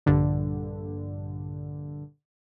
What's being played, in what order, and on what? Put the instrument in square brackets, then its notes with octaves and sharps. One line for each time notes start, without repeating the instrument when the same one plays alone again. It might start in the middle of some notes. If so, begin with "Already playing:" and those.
[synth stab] A#1 G2 D3